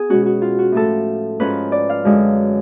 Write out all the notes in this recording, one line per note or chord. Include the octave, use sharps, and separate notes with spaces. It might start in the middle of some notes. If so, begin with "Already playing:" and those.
Already playing: B3 G#4
B2 G#3 C#4 F#4
F#4
F4
F#4
A2 F3 A3 A4
G#2 F3 G#3 C#4 B4
D5
F5
F#2 D3 G#3 C#4